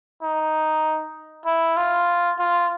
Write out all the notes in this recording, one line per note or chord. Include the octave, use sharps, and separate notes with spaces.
D#4
E4
F4
F4